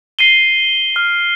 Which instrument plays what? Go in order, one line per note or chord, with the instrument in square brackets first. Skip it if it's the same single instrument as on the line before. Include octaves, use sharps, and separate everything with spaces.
[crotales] C7 D#7 G7
F6